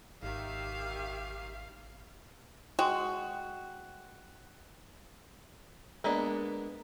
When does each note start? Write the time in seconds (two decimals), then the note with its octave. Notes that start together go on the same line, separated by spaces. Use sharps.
0.23 G#1 D#3 G4 E5 F5
2.79 G#3 F#4 G5 C6
6.04 G#3 A#3 B3 D4